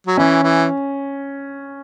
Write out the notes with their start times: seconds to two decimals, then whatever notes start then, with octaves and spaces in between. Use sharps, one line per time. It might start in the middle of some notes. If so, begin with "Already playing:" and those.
0.07 F#3
0.17 E3 C#4
0.43 E3